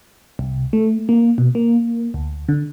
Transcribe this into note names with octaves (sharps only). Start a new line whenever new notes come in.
C2
A3
A#3
B2
A#3
D2
D3